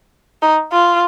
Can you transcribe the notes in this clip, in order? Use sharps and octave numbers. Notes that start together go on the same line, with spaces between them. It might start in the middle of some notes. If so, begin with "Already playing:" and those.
D#4
F4